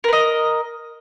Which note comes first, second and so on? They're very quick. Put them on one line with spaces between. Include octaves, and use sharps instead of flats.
A#4 B4 D#5